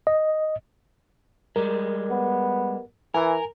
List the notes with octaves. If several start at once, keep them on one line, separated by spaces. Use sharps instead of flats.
D#5
G3 G#3 A#4
B3
E3 A#4 G#5